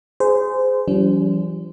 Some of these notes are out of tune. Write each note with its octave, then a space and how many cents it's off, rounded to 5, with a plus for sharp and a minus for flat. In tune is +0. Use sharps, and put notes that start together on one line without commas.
G#4 +0 C5 -25
E3 +35 G3 -40 C#4 +45